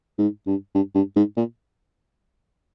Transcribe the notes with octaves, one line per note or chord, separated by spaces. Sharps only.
G#2
G2
G2
G2
G#2
A#2